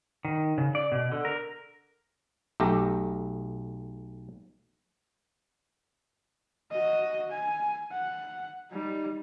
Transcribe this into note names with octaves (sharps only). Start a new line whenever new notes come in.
D#3
C#3
D5
B2
D3
A#4
B1 A3 G4 A#5
F#4 D#5
G#5
F#5
G3 D#4